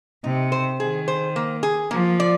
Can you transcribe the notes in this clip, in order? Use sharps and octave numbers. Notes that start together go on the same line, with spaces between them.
C3 D#4
C5
D#3 G#4
C5
A#3
G#4
F3 A#3
D5